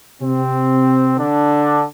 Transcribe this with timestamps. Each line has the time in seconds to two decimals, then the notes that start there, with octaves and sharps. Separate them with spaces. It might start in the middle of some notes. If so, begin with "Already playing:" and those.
0.21 C3 C4
1.18 D3 D4